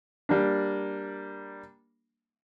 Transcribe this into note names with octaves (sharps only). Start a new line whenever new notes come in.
G3 A#3 D4